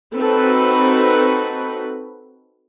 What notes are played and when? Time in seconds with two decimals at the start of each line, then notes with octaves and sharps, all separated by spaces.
0.17 C4 D#4 F#4 A4 B4 B5